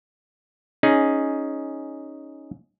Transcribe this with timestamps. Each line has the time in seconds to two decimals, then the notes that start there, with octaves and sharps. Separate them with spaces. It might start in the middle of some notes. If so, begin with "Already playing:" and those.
0.83 C#4 D#4 G#4